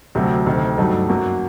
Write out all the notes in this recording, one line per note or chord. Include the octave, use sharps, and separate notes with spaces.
D2 C3 F#3 A3
D2 C3 D#3
G2 F#3 A3 D#4
F#2 F#3 A#3 F#4